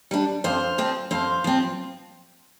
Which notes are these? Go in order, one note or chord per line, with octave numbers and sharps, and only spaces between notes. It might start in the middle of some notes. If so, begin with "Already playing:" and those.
G3 D4
F2 C5 F5
F3 C4
F2 C5 F5
F3 C4